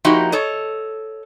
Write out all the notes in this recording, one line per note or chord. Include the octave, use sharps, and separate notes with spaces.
F3 A#3 D#4 E4 F#4 G4
A4 C#5 D#5